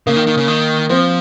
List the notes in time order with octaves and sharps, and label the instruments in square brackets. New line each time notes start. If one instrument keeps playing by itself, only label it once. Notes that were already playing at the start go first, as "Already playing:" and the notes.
[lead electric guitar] C#3 [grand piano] A#3
[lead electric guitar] D#3
D#3
C#3
D#3
[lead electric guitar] F3 [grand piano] C4